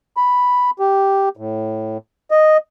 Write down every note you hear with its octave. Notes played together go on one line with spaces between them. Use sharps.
B5
G4
A2
D#5